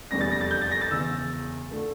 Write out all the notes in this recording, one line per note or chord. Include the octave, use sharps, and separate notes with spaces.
F1 E2 D3 G3 C#4 A#6
A6
A#6
A6
G6
A6
A#6
A6
E1 E2 C#3 E6
D3 A3